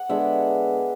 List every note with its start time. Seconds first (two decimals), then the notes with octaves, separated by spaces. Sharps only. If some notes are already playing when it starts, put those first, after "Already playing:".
Already playing: F#5
0.09 D3 G#3 B3 D4 E5